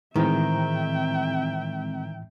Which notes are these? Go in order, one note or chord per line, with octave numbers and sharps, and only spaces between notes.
A2 D#3 E3 G#3 C4 E5 G5 A#5